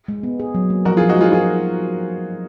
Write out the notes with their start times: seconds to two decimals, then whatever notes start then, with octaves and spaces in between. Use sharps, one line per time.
0.08 G#3
0.23 B3
0.40 G#4
0.55 F#3
0.70 A#3
0.85 F3 F#4 A#4
0.97 F4 G#4
1.01 F3
1.09 D#4 F#4
1.17 G#3 F4 G#4
1.32 F4 G#4 A#4